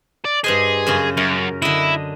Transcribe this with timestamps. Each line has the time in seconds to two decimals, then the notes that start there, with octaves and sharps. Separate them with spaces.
0.25 D5
0.44 G2 G#4 C5 D#5
0.87 F#2 C#3 C#4
1.17 F#2 A#4
1.62 D3 E4 D#5